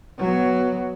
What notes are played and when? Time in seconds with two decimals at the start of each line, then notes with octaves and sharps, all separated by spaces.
0.18 F#3 B3